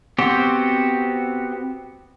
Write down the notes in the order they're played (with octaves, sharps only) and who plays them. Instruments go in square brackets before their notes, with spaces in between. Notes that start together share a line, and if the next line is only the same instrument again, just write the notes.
[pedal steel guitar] B3 C4 F#4 G4 C5